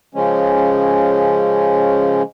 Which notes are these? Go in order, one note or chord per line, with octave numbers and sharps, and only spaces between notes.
C#3 F3 G#3 C#4